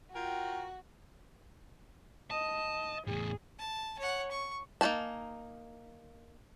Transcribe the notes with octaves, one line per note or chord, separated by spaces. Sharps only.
F4 F#4 A#4 G5
D#5 A5
E2 A2 G#4
A5
C#5 F#5
C#6
A#3 D#4 F#4 G#5 A5